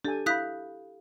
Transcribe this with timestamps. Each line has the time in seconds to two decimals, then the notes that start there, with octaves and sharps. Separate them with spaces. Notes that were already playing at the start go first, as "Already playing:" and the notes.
0.05 D4 G4 A4 G#5
0.26 E4 F5 B5 D#6 F#6 G6 B6